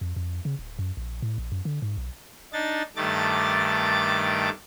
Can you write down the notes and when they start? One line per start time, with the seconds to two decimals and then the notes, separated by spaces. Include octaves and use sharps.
0.01 F2
0.16 F2
0.45 C#3
0.59 D1
0.79 F#2
0.97 A#1
1.22 A2
1.38 A#1
1.52 F#2
1.65 D3
1.82 G#2
1.97 B1
2.53 D4 D#4 A6
2.96 G2 D#3 A3 D6 A6